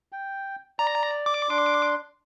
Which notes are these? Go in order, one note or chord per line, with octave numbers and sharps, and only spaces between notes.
G5
D5 A#5
D6
D4 C6